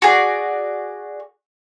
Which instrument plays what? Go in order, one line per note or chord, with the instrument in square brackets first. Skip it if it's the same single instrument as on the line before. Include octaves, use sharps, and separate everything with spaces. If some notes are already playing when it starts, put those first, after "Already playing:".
[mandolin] F#4 G#4 D5